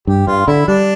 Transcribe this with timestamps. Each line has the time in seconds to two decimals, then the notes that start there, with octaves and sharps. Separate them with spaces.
0.07 G2 G4
0.27 G2 F4
0.47 D3 E4
0.68 G3 D4